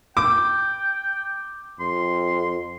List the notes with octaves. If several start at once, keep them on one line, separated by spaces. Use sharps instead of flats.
G5 D6
F2 C6